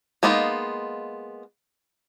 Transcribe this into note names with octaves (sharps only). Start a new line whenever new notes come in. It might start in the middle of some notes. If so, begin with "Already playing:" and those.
G#3 A#3 B3 D#4 F4